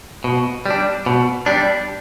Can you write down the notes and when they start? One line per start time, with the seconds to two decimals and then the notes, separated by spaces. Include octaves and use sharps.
0.24 B2
0.66 G3 D4
1.06 B2
1.46 G3 D4